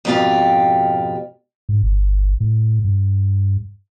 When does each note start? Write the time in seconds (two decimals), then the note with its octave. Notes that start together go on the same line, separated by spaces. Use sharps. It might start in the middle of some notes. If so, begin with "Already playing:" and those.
0.05 F2 G#2 B2 D#4 F4 G4
1.69 G#2
1.83 G1
2.40 A2
2.84 G2